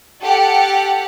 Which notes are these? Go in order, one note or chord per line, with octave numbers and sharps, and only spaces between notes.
G4 A4 F#5